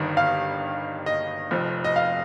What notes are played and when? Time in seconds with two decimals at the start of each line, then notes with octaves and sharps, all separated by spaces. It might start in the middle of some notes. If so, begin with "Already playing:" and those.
Already playing: G1 G2 D#3
0.17 F5
1.06 D#5
1.51 F1 F2 F3
1.84 D#5
1.96 F5